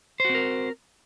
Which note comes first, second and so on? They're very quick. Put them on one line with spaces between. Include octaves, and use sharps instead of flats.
C5 F#4 C4 A#4